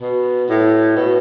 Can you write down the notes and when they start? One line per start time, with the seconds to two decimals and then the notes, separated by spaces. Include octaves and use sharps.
0.02 B2
0.49 A2
0.96 B2